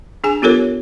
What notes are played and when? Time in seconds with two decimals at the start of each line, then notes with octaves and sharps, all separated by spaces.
0.24 D4 G#4 G#5
0.42 B3 F4 G4 A4 A#4 C#5